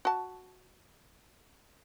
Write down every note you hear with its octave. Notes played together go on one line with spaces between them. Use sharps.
F#4 A5